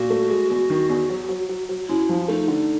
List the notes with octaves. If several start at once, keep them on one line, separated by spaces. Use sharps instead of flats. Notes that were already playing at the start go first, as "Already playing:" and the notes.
Already playing: A#2 F#4
A3
G#3
E2
D#3
E2
F#3
F#3
F#3
F#3
F#2 E4
F3
A3 D#4
D3